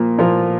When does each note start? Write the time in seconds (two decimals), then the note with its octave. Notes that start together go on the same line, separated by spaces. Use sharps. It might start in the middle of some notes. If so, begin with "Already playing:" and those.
Already playing: A#2 F3 A#3
0.18 A#2 F3 A#3 F4 A#4